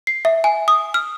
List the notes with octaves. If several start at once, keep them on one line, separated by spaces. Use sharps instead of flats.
C7
E5
G#5
D#6
F6